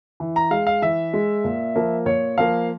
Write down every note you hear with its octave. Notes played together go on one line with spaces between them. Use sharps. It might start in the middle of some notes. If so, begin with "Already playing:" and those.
E3
A#5
G#3 F5
F5
E3 E5
G#3
A#2
F3 A#3
A#2 C#5
F3 A#3 F5